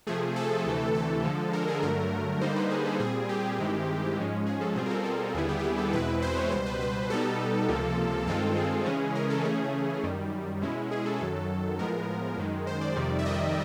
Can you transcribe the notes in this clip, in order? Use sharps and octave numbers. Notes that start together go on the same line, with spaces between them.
C3 F3 A3 G#4
A4
D2 C3 E3 A3
A4
D3 F3 G#3
A#4
G#4
G2 D3 F#3 A3 A#4
D3 G3 A#3 D#4 C5
B4
G#4
A4
A#2 G3 C4 G#4
G4
G2 D#3 G#3 C4 E4
G#2 F3 G#3 C#4
G#4
A4
B2 G3 C4 F4 G#4
A#4
A4
A4
D#2 D3 G3 B3 E4 G#4
G4
G4
G#4
A4
E2 B2 G#3 C4 E4 B4
C5
C#5
C#2 B2 G3 C5
B4
B4
B2 G3 B3 D#4 A4
C#2 C3 F3 A#3
G2 D#3 G#3 C4 F4 A4
G#4
C#3 E3 G#3 C#4
A#4
A4
C#3 E3 A3 C#4 G#4
F#2 D#3 G3
B2 G#3 C#4 E4
G#4
A4
F#2 D#3 F#3 A4
A2 F3 G#3 B3 A#4
F#2 D#3 G#3
C5
D5
F2 C3 D#3 G3
E5
D#5